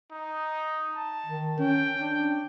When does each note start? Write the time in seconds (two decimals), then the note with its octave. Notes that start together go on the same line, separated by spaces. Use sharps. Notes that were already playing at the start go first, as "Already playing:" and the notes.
0.11 D#4
0.95 A5
1.26 D#3
1.59 C#4 G5
2.00 D4